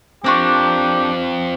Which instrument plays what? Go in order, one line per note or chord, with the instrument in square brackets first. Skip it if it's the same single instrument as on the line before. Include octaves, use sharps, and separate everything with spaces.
[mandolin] A#3 D4 C#6 [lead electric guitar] C4 F4 [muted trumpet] G4